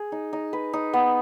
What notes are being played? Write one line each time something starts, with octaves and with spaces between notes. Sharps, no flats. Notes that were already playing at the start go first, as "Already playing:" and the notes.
Already playing: G#4
D#4
D#4
B4
D#4
B3